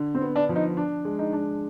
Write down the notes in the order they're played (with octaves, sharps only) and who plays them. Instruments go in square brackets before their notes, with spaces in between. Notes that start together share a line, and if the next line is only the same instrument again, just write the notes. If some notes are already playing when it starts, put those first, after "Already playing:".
Already playing: [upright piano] D3
[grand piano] C4
[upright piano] B3
[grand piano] D4
[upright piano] F3
[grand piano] D#4
[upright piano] D4
G#3
[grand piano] D#4
[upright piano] D4